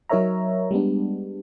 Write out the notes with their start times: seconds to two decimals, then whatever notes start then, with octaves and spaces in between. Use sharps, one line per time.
0.09 F#3 D#4 A#4 C#5 E5 A#5
0.71 G3 G#3 B3 D4